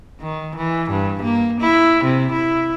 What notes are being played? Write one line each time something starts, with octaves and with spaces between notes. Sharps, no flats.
D#3
E3
G2
A#3
E4
C3
E4